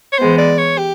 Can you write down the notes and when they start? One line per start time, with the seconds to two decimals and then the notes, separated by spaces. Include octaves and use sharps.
0.13 C#5
0.19 E3 G#3 B3 C5
0.38 D5
0.58 C#5
0.78 G4